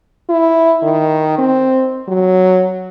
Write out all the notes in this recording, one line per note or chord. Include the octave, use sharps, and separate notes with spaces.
E4
D#3
C4
F#3